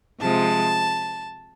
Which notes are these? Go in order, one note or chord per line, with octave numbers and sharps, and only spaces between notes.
C3 F3 G#3 A5